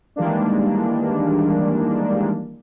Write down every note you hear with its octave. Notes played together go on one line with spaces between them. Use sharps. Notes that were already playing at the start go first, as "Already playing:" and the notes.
D#3 E3 G3 G#3 A#3 D4